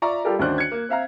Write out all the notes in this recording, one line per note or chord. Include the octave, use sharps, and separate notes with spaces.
F4 D5 E5 A#5 C#6
G3 F4 G4 A4 A#4 D5
D2 D#3 C#4 D4 C5 F#6
G#6 C#7
A#3
C4 E5 F5 A#5